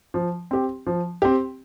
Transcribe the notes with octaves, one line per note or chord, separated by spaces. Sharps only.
F3
C4 G4
F3
C4 G4